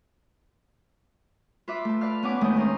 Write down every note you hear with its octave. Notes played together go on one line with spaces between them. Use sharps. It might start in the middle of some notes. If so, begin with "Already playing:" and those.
F4 B4 E5 D6
A3 A5
B4 D5 F5 F6
B3 C#4 F#5 G#5 D6
D#2 G#3 A3 D4 G5 D#6
C4 C#4 A#4